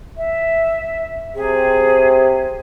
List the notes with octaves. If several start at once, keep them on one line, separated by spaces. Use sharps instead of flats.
E5
C3 G#4